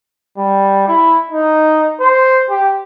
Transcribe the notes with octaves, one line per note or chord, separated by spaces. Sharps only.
G3
E4
D#4
C5
G4